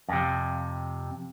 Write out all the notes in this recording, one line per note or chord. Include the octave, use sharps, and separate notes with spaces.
F2 C3